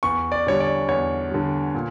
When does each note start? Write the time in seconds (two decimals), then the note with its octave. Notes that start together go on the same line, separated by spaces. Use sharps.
0.03 E2 C#6
0.32 D5
0.47 D3 G3 C#5
0.60 D5
0.89 E2 C#5
1.31 D3 G3
1.74 A#2